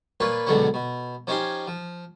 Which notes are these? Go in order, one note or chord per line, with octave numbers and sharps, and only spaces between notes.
A#2 F4 B4 C#5 B5 C#6
C#2 B2 D3 F#3 C#4 C#6
B2
F3 C#4 D#4 G4 G#5 C6
F3